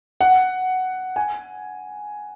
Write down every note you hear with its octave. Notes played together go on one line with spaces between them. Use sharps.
F#5
G#5